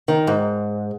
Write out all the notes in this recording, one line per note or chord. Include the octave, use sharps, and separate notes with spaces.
D#3
G#2